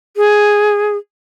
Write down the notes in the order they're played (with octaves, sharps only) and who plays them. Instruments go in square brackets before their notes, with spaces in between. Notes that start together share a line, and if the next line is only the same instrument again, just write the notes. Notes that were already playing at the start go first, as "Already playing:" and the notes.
[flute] G#4